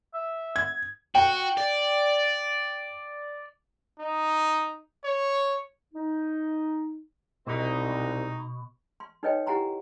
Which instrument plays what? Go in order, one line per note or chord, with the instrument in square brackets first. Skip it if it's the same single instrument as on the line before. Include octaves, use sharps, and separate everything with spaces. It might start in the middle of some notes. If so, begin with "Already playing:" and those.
[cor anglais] E5
[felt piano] G#6
[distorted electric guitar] F#4 [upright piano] G5
[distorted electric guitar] D5
[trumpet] D#4
C#5
[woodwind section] D#4
[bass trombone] C2 [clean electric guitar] B2 [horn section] G#3 C4 D#4
[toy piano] C6
D#4 A4 B4 C#5 D#5 G5
E4 G4 F#5 G#5 A#5 C6